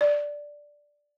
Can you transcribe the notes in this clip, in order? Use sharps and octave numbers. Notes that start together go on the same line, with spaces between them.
D5